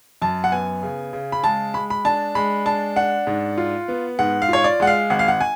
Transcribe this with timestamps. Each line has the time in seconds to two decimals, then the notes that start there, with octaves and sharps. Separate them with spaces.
0.22 F#2 A5
0.44 F#5
0.52 B3 G#5
0.83 C#3
1.13 C#3
1.32 B5
1.44 G#3 A5
1.74 G#3 B5
1.90 B5
2.05 D4 A5
2.35 G#3 B5
2.66 D4 A5
2.96 D4 F#5
3.27 G#2
3.58 F4
3.88 B3
4.19 G#2 F#5
4.42 F5
4.49 F4 C#5
4.64 D5
4.80 G#3 F#5
4.87 F5
5.10 G#1 F#5
5.19 F5
5.28 F#5
5.41 G#5